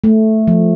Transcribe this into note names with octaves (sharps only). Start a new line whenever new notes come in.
A3
F3